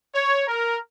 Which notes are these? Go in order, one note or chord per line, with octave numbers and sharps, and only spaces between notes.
C#5
A#4